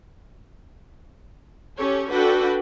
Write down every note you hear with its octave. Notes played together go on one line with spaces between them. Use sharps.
C#4 G4 A4 C#5
D4 F#4 A4 B4 F#5 G5